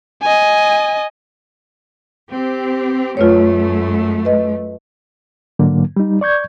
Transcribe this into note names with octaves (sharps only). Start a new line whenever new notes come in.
D#5 G#5
C4 G4
F#2 A3 F4 B4 C#5
B4 D#5
G#2 D3 F#3 A#3
G3 D#4
D5 C#6 G6 G#6